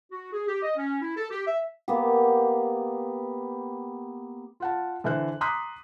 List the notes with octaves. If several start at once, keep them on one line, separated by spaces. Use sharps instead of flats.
F#4
G#4
G4
D#5
C#4
E4
A4
G4
E5
A#3 B3 G4
F4 F#5 A5
D3 E3 E4 C5 F#6
A#5 C6 D6 D#6 F#6 B6